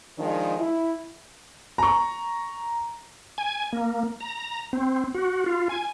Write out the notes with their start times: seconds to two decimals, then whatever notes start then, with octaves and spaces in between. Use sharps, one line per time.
0.19 D#3 F3 G#3 D4
0.60 E4
1.78 A#5 C#6
3.38 G#5
3.73 A#3
4.21 A#5
4.73 C4
5.15 F#4
5.46 F4
5.69 G#5